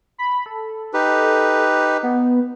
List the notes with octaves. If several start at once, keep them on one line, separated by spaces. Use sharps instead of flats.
B5
A4
D#4 G4 B4
B3